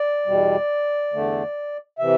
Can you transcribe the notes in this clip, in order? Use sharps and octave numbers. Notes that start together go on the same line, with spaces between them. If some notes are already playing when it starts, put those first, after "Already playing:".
Already playing: D5
E2 B2 G3
E2 D3 A3
C3 E3 E5